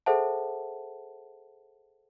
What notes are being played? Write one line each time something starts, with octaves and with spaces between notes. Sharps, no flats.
G#4 A4 C5 E5 F#5 A5